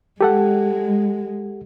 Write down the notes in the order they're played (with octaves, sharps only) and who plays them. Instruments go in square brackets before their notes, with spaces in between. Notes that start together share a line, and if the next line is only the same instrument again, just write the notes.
[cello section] G#3 [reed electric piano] G4 A4 F#5